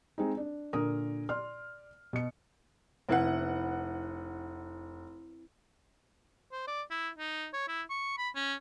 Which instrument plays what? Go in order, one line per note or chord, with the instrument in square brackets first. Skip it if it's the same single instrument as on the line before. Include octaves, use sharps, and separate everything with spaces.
[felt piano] G#3 C4 D#4
D4
A#2 D3 A#4 D#6
D5 C6 F6
B2 C#7
[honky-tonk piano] F1 F#5 [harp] C4 E4 B4
[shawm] C5
D5
E4
D#4
C#5
E4
C#6
B5
C#4